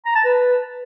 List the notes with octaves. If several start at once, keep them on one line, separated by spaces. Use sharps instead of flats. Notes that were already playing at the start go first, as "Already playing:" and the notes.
A#5
A5
B4